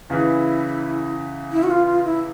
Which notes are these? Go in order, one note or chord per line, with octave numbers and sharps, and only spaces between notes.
E2 C#3 E3 E4
E4
F#4
F4
F4
E4